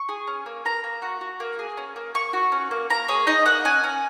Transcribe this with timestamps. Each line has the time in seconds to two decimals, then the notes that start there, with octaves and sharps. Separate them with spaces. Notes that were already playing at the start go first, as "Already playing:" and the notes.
Already playing: C#6
0.09 G#4
0.27 C#4
0.46 A#3
0.65 A#3 A#5
0.84 A#3
1.02 F#4
1.21 F#4
1.40 A#3
1.59 G#4
1.77 C#4
1.96 A#3
2.15 A#3 C#6
2.33 F#4
2.52 C#4
2.71 A#3
2.90 A#3 A#5
3.08 G#4 C#5
3.27 D#4 D#5
3.46 A#3 F#5
3.65 C#4 G#5
3.84 C#4